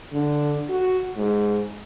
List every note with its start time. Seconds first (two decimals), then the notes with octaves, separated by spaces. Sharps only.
0.13 D3
0.70 F#4
1.17 G#2